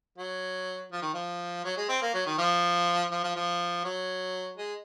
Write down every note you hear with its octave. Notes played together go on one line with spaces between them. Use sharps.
F#3
F3
D#3
F3
F#3
G#3
C4
A#3
F#3
D#3
F3
F3
F3
F3
F#3
G#3